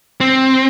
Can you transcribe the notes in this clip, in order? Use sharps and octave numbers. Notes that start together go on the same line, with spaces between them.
C4